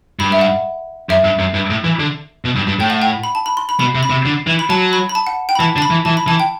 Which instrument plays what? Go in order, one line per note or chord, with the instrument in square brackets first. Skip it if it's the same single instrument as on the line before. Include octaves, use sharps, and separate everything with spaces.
[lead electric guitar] G2 [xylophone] B5
[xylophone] E5
F#5
[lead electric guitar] F#2 [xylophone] E5
[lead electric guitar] G2
F#2
G2
A2
E3
D3
B2
G2
G2
[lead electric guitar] A2 [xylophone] G5
[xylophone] F#5
G5
B5
A5
B5
C6
B5
[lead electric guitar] B2 [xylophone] B5
[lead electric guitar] C3
[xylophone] B5
[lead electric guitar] C3
D3
E3
[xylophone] B5
[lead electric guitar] F#3 [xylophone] A5
[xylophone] B5
B5
A5
F#5
G5
B5
[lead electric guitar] E3 [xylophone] A5
[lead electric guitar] D3 [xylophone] A5
[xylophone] B5
[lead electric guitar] E3
[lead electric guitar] E3 [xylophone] A5
[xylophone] B5
[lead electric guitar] E3 [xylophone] A5
[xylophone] G5